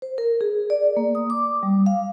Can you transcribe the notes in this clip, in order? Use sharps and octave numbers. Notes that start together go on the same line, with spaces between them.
C5
A#4
G#4
D5
A#3
D#6
D6
G3
F5